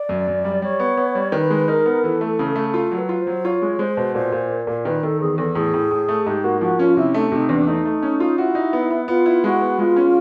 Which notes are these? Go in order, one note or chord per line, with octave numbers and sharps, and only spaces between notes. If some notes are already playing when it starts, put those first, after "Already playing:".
Already playing: D5
F#2
F#2
G3
G3 C#5
B3
B3
G3
D#3 B4
G#3
D#4 A#4
B3
E3 A4
A3
C#3
A3
F4 A4
F#3
B4
F4
C5
F#3
F4 C#5
G#3
G#3 C5
B2
A#2 C5
A#2
A#3
A#2
D#3 B4
D#3 A4
E2 G#4
E2 A4
A2 G#4
A2
A2
A3
G#2 G4
A#3 F#4
F3 F#4
C#4 F4
C3 E4
A3 D#4
C3 D#4
E2 D4
A3 D#4
A3
C#4
F4
E4 F#4
D#4
B3
B3
B3 F4
E4
G#3 F#4
B3
G#3 F4
C#4